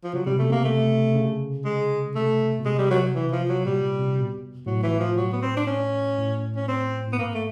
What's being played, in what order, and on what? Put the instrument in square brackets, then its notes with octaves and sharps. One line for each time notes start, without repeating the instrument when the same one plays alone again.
[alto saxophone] F3
[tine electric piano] C#3 [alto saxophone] F#3
[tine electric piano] C3 [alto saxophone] G3
[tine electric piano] B2 [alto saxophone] A3
[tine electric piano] C3 [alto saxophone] A#3
[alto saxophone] A3
[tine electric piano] C#3
[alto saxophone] G#3
[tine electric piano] C3 [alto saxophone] A3
[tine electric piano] B2
[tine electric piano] C3 [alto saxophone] G#3
[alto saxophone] G3
F#3
E3
F3
F#3
[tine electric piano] A#2 [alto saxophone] G3
[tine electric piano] C3
B2
[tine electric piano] A2 [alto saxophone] F#3
[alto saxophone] E3
F3
F#3
B3
C4
D4
C#4
[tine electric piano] A2
[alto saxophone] C#4
C4
[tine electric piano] A2
[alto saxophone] B3
[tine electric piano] G#2 [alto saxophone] A#3
[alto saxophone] A3